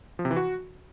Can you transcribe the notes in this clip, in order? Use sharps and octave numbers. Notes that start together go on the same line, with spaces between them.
F3
C3
E3
F#4